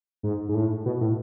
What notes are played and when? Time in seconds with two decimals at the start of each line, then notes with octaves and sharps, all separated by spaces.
0.23 G#2
0.49 G#2
0.55 A2
0.86 B2
1.01 A2